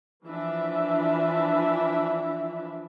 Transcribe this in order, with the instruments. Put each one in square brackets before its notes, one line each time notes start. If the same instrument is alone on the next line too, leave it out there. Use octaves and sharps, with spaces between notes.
[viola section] E3 F3 D4 F4 E5